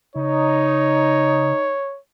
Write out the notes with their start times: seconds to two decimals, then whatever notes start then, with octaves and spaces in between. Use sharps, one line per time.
0.16 C#3 D#4 C#5